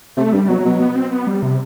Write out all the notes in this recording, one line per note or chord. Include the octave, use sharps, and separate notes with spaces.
C3 A3
G2 G3
B2 F#3
B2
B3
C4
B3
G3
C3